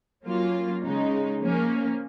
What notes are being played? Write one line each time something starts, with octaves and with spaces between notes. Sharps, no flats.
F#3 A#3 C#4 F4
C#3 G#3 D#4
F3 A#3 C#4